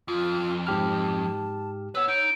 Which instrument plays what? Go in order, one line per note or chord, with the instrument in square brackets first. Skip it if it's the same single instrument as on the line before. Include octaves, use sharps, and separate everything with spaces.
[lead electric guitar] F2 [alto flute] F4
[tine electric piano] G#2 G4 F6 [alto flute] A5
[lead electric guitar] B4 F#5 [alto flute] C#5 [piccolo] E6
[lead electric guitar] D#4 [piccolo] D7